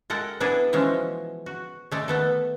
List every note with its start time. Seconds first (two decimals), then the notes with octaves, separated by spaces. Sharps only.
0.10 G#3 A4 A#4 F#5 G5
0.40 B3 D4 E4 G#4 A4 B4
0.73 B2 E3 F3 G#3 B3 C#4
1.46 F#4
1.91 G#3 A3 D5
2.08 D#3 A3 B3 A4